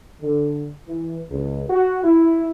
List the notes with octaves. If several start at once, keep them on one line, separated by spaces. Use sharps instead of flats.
D3
E3
C#2
F#4
E4